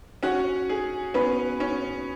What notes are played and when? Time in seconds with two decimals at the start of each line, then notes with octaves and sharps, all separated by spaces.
0.23 C#4 F#4 F#5
0.69 G#4
1.14 B3 C#4 B4
1.60 C#4